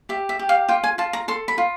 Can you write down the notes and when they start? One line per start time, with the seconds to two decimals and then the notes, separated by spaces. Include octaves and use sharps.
0.09 G4 E5
0.29 E5
0.39 G4
0.49 F5
0.69 F4 G5
0.84 G#5
0.98 F4 A5
1.13 A#5
1.28 A4 C6
1.48 B5
1.58 F4